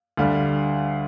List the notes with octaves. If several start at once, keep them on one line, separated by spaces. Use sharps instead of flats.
D2 D3 G3 F5